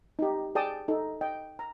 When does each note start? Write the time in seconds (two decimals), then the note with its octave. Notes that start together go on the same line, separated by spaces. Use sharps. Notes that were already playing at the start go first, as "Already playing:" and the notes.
0.19 D#4 G4
0.55 G#4 D5 G5 A5 D#6
0.88 D#4 A4
1.21 D#5 G5
1.59 A#5